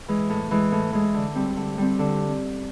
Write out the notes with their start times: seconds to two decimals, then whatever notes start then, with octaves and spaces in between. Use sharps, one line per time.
0.08 E3 G#3
0.30 A2
0.51 E3 G#3
0.72 A2
0.93 E3 G#3
1.14 D3
1.35 G3 C4
1.56 D3
1.78 G3 C4
1.99 D3